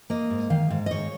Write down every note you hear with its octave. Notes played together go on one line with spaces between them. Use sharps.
A#3 D#5
G#2
D#3 F5
G#2
D#5
G#2 C#5